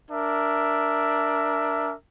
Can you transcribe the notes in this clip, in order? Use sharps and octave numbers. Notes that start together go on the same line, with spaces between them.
D4 A#4 E5